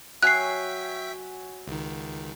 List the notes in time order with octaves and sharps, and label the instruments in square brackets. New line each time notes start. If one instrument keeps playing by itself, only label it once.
[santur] F#3 G#5 C#6 [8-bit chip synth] E5 G5 B6 [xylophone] F#6 C7
[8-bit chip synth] C#2 D#3